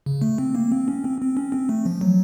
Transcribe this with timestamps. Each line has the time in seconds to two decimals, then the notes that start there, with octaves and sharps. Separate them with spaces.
0.06 C#3
0.22 A3
0.38 C4
0.55 A#3
0.72 C4
0.88 C#4
1.04 C4
1.21 C4
1.37 C#4
1.52 C4
1.69 A3
1.86 F3
2.01 F#3